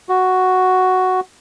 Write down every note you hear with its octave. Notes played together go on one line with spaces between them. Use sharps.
F#4